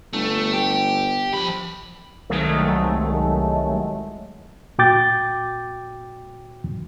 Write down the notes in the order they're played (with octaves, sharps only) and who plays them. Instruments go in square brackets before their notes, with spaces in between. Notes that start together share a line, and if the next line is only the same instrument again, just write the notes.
[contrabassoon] G1 [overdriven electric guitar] A3
[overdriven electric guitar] G4
F3 B5
[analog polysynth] C2 D#3 F#3 G#3 A3
[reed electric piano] A#2 F#4 G5 D6 G6 A6